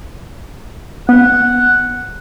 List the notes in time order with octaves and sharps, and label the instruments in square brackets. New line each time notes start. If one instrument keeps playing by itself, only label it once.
[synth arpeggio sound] B3 [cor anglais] F#5